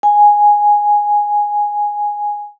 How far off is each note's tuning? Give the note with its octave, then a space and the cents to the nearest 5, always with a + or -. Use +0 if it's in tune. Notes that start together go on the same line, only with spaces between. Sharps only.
G#5 -5